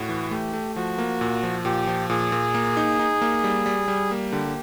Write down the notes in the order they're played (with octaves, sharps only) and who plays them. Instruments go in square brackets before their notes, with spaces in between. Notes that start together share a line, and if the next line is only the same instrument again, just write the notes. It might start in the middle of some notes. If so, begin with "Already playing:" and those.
Already playing: [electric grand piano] A2 [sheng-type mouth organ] F#4
[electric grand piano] E3
[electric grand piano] A3 [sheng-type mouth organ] G4
[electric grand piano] A3
[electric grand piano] F3 [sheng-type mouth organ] F#4
[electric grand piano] A#3
A#2
F3
[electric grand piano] A#2 [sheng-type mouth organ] G4
[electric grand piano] F3
[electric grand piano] A#2 [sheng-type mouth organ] G#4
[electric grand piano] A#2
A#3
D#4
D#4
A#3
G3
G3
G3
A#3
[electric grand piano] D3 [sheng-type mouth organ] G4